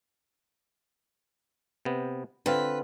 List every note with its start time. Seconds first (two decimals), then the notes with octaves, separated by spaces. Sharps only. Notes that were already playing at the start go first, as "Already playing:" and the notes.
1.85 C3 B3
2.46 D3 C4 F4 B4